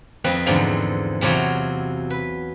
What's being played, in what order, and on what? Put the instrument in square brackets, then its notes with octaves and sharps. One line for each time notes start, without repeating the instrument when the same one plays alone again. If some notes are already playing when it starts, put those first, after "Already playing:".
[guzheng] F2 C4 B4 D#5
E2 G#2 D3 F3
E2 C3 F#3 F4 C#5
B4